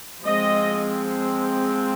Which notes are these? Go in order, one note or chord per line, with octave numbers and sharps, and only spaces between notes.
F3 G#3 C4 D#5